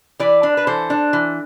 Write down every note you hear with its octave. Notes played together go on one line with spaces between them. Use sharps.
E3 B4 D5
D4
B4
E3 A4 C5
D4
E3